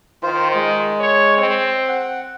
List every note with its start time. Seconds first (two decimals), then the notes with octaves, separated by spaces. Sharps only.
0.23 D#3 F4 C5
0.55 G#3
1.00 C#5
1.38 C4
1.88 F#5